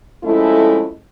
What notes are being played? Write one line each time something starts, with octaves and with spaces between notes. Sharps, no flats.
F2 G#3 A3 C#4 E4